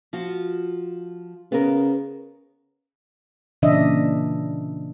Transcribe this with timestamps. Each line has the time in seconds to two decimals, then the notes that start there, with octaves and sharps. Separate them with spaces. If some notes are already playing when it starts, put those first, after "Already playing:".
0.13 F3 F4 F#4
1.52 C#3 B3 A#4
3.62 A#2 C#3 E3 D4 D#5 E5